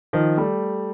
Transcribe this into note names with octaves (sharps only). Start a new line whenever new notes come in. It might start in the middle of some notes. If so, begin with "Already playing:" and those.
D#3 F3
G3 A3